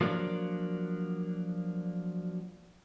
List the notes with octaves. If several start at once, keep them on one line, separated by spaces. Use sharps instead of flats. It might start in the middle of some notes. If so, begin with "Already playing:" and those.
F3 F#3 A#3 D4